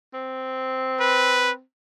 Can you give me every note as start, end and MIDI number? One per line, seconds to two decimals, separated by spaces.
0.14 1.62 60
1.00 1.51 71